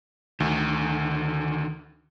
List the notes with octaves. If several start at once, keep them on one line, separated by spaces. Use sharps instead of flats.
D2 D3 D#3